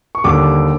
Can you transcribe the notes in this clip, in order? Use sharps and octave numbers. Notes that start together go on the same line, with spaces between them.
C#6
D#2 D3 G3 D6